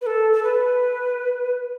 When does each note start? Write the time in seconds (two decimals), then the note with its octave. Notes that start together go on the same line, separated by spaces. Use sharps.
0.02 B4
0.06 A4
0.33 A4
0.43 B4